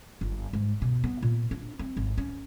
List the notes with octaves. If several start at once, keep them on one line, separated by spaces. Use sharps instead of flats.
G1
G#2
B2
B3
A#2
D4
C4
G#1
C#4